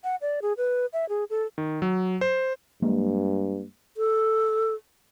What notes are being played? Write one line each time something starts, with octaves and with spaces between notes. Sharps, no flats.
F#5
D5
G#4
B4
E5
G#4
A4
D#3
F#3
C5
G2 F#3 G#3 A#3
A4